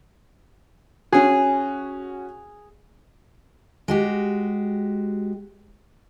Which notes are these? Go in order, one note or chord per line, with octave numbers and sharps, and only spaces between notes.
C#4 F#4 G#4
G#3 F#4 G4